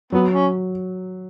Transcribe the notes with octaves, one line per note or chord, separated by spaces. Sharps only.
F#3 B3
C#4